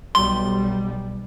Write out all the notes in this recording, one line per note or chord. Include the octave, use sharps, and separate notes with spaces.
B1 G3 C6